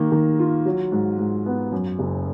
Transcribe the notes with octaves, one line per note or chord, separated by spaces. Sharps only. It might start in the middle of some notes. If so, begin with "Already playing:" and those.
Already playing: D#3 A#3
D#3
F4
F#3
G#2
G#2
B3
F#2
F#1